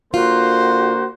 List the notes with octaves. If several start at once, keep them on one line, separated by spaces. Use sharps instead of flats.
D3 A#3 F4 F#4 C5